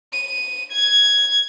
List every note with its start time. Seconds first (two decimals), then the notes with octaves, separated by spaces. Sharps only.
0.13 D#7
0.73 G#6